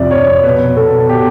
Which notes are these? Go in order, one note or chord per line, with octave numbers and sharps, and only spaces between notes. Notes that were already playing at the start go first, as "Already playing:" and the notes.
Already playing: F2 C3 F3 D5 E5
F2 C#5
B2 B4
B2 A4
B2 G4